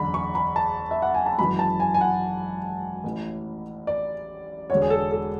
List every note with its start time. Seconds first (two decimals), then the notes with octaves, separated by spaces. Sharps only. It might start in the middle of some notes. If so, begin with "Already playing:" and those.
Already playing: F#1 E2 D3 B5
0.14 C#6
0.35 B5
0.56 A5
0.91 E5
1.02 F#5
1.14 G#5
1.26 A5
1.38 G#1 F#2 E3 B5
1.59 A5
1.80 G#5
1.94 G#5
2.01 F#5
3.04 A1 A2 E3
3.87 D5
4.70 E1 E2 D3 C#5
4.82 G#4
4.90 A4
5.11 A4